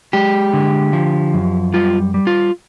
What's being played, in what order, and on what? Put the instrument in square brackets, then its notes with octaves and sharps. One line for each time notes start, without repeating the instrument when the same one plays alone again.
[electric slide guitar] G#3 G4
D3
F3
F#2
G3 F4
G3
F4